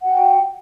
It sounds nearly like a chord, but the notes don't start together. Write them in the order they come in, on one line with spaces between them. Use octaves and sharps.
F#5 F#4 G5